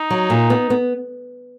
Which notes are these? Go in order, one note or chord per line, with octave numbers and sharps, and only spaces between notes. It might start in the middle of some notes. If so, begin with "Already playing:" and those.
Already playing: D#4
F#3
A#2
B3
B3